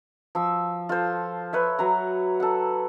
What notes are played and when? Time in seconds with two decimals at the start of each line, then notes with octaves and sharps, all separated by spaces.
0.35 F3 E6
0.89 F4 A4 C5
1.53 B4 C#5 E5
1.79 F#3 B4 A#5
2.40 A4 F#5